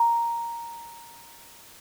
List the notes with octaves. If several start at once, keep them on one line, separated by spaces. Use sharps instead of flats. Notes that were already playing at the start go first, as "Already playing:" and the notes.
Already playing: A#5